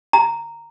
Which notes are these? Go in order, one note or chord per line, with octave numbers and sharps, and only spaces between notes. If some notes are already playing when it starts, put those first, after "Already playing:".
A#5